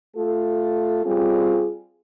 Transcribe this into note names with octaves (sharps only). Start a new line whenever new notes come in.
A3 F4 A4
G3 C4 F4 G#4